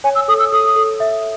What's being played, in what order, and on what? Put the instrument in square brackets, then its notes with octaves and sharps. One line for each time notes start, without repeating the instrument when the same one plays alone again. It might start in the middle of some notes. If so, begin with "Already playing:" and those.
[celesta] C#5 [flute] G#5
[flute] E6
[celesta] A4 [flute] D#6
[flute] E6
[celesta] A4 [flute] D#6
[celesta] A4
E5